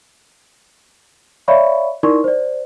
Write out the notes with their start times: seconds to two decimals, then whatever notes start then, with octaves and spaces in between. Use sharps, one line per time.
1.48 C#5 D5 E5 F5 B5 C#6
2.03 D#4 E4 A#4 D5 C6 C#6
2.24 C5 D5